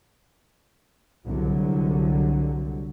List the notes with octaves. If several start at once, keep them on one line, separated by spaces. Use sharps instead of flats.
C2 D3 F#3